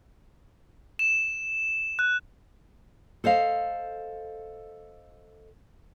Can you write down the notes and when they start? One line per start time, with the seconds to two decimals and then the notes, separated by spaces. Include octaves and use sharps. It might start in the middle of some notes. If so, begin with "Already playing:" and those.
0.99 E7
1.99 F#6
3.24 A4 C5 D#5 F5